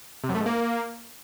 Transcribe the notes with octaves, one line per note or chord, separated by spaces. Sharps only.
C3
F#2
A3
G#2
A#3